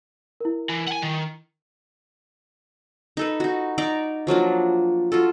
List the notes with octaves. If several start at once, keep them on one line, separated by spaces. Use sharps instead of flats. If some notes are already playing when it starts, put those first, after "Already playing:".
E4 A#4
E3
F#5 G#5
D#3
D#4 A4 B4
D#4 F#4
D#4 D5 A#5
F3 F#3 A#3 D4
F4 F#4 A4